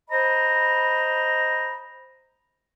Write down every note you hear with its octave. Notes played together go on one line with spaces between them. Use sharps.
C5 D#5 A#5 B5